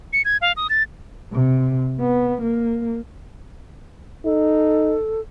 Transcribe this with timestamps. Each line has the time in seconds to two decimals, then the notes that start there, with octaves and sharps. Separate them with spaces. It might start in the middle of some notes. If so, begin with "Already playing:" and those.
0.13 C#7
0.25 G#6
0.41 F5
0.57 D#6
0.70 A6
1.32 C3
2.00 B3
2.41 A#3
4.25 D#4 A4